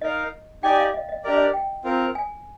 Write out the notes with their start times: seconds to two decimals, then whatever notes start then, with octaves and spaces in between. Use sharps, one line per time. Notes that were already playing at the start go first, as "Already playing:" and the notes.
0.01 D#4 A#4 D#5 F5
0.63 D#4 G4 D5 G5 G#5
0.78 F5
0.94 D#5
1.09 D#5
1.24 D4 G4 A#4 D5 D#5
1.34 D#5
1.53 G5
1.84 C4 F4 A#4
2.15 G#5